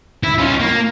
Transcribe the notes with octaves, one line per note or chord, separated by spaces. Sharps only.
E4
C#4 F4
A#3